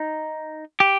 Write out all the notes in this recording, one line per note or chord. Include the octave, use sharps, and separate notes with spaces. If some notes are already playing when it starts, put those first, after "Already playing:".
Already playing: D#4
G4